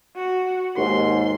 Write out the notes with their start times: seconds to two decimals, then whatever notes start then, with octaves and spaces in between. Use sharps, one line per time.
0.17 F#4
0.77 D#2 G#2 C6